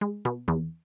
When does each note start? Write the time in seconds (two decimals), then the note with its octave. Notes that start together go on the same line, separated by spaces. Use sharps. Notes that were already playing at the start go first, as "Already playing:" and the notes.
0.01 G#3
0.25 B2
0.48 E2